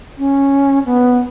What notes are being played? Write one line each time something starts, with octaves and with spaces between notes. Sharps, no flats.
C#4
B3